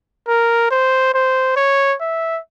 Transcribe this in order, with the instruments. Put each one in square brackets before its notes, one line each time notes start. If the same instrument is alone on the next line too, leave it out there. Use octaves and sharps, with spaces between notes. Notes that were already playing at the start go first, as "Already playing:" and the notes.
[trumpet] A#4
C5
C5
C#5
E5